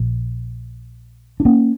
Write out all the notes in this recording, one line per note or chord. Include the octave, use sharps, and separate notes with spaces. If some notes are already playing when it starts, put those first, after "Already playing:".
Already playing: A#1 A#2
D4
A#3 C#4